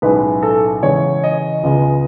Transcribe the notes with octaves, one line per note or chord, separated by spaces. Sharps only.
B1 A2 G#3 C#4 B4
A4
E2 C#3 G#3 C#5
D#5
C#2 C#3 G#3 B3